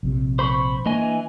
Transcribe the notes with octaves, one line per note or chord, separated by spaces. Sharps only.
A#1 C3
C5 B5 C#6
E3 A#3 D4 D#5 G#5